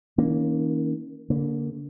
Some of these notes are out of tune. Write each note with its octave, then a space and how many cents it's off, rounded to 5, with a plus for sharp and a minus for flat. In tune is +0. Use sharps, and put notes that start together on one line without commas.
D#3 +40 A#3 +0 C#4 +0
D3 -30 A#3 +0